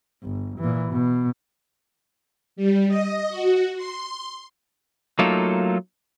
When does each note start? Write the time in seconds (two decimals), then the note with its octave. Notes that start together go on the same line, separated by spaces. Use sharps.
0.23 G1
0.59 A#2 E3
0.91 B2
2.56 G3
2.88 D#5
3.29 F#4
3.76 C6
5.19 F#3 A3 A#3 D#4 F4 A4